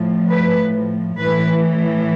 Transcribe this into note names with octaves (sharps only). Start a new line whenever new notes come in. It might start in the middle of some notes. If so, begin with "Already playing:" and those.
Already playing: A2 F3
B4
A2 E3 B4